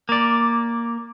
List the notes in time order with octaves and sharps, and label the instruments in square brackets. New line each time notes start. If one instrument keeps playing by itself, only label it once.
[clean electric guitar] A#3 D5